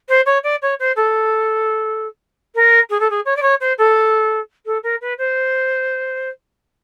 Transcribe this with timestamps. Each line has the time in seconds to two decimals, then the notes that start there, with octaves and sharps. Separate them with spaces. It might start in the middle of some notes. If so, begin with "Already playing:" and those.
0.08 C5
0.25 C#5
0.43 D5
0.61 C#5
0.79 C5
0.95 A4
2.55 A#4
2.89 G#4
2.99 A4
3.09 G#4
3.25 C#5
3.36 D5
3.42 C#5
3.60 C5
3.77 A4
4.65 A4
4.83 A#4
5.01 B4
5.17 C5